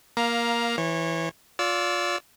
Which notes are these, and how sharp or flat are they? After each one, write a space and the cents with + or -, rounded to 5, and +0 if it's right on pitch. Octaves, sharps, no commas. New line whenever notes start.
A#3 +15 F5 +0 A#5 +10
E3 +0 C#5 -25
F4 +20 D5 -30 E6 +5